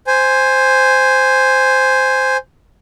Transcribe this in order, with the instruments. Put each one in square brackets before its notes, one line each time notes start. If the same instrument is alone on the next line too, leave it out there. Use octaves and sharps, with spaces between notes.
[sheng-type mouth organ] C5 G#5